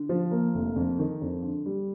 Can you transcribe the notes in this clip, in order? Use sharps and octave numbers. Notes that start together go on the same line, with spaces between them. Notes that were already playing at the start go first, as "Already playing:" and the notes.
Already playing: D3
F3
A#3
F1
F2
D#3
F2
D3
G3